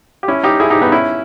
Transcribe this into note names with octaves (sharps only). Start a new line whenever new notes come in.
G4
C#4 E4
D#4 G4
E4 G#4
D#4 G4
B3 D#4
C#4 E4